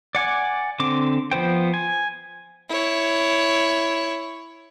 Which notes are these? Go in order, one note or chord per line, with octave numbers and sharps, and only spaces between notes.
D5 F#5 G#5 D6
D3 C4 D6
F3 B3 C5 G5
G#5
E4 C#5